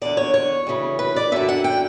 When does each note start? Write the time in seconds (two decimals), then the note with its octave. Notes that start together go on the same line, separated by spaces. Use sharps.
0.01 E2 D3 D5
0.17 C#5
0.34 C#5
0.67 D2 C#3 E3
0.99 B4
1.16 D5
1.32 F#2 D3 E5
1.49 F#5
1.64 G5